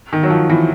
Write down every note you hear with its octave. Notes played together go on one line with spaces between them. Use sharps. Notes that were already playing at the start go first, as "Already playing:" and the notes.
D#3
F#3
F3
E3